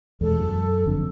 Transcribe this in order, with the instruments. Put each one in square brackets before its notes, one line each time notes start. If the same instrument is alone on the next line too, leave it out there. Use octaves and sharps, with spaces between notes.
[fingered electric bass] E2 B2 G#3 [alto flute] A4
[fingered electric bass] F#2
G1 F2 D3